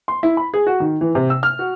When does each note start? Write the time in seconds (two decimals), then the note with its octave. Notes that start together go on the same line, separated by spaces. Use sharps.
0.08 C6
0.23 E4
0.37 B5
0.54 G#4
0.67 F#4
0.80 D#3
1.01 E3
1.15 C3
1.30 E6
1.43 F6
1.59 F#4